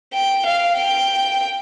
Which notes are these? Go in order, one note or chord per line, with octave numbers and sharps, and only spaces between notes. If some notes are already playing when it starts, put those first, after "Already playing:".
G5
F5
G5